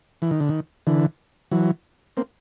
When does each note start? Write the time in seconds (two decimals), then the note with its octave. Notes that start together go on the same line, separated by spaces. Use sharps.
0.22 E3
0.31 D#3
0.40 D3
0.49 D#3
0.87 D3 E3
1.51 E3 F#3
2.17 A#3 C4